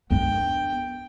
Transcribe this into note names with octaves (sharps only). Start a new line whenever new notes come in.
B3 D4 G5